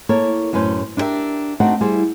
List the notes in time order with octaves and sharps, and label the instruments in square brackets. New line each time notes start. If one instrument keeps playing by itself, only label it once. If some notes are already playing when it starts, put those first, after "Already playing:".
[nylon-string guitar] A#3 E4 A4 A#4 C#5
F#2 A2 C#4 B4 C5
D4 E4 G4 A#4 E5
A3 C4 D4 D#4 F#4 F#5
G3 E4 G#4 C5